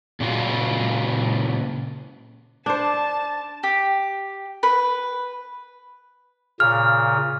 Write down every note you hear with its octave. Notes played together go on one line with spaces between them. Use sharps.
A#2 C#3 F4 F#4
D4 C5 A5
G4
B4
A#2 C#3 F6